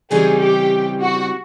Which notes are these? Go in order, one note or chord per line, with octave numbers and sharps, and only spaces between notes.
C#3 E3 G3 C4 D#4 G#4
G4
F#4